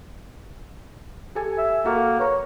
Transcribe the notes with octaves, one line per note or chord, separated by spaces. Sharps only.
G4 A4 G#5
E5
A#3 F#4 A4
B4 C#5 A#5